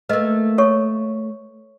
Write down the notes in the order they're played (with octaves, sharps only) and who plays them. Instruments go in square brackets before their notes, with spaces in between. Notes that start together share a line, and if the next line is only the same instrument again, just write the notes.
[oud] A3 A#3 [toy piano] B4 D#5
[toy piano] A4 C#5 C#6